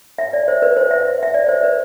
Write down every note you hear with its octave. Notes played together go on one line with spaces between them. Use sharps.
E5
D5
C5
B4
C5
E5
E5
D5
C5
B4